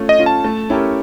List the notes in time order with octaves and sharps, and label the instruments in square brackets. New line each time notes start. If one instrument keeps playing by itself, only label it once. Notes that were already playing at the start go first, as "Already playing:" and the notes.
Already playing: [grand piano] A3 C#4 F4
[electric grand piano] D#5
[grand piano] C#4 F4
[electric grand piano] A5
[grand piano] A3
C#4 E4 G4 A#4